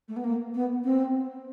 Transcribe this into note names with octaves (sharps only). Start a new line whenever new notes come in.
A3
B3
A#3
B3
C4